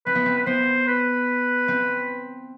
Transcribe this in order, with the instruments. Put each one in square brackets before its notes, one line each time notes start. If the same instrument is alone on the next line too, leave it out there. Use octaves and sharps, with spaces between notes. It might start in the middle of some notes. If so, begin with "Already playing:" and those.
[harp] C4 [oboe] B4
[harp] B3
C4
[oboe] B4
[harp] B3 [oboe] C5
[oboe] B4
[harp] C4